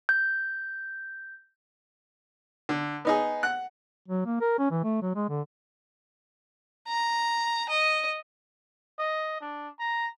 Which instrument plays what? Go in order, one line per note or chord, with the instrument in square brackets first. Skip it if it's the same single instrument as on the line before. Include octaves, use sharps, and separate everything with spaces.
[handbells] G6
[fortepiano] D3
B3 D#4 G#4
F#5 F#6
[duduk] F#3
A#3
A#4
C#4
E3
A3
F#3
G#3
D3
[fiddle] A#5
D#5
[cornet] D#5
D4
A#5